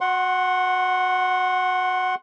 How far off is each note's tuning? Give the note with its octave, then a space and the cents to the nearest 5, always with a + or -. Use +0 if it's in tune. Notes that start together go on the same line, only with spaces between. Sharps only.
F#4 -25 F#5 +0 C6 +25